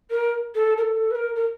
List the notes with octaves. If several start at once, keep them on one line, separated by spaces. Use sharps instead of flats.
A#4
A4
A#4
A4
B4
A#4
A#4